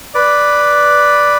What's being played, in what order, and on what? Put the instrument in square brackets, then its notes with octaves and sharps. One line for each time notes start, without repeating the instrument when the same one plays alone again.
[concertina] B4 D5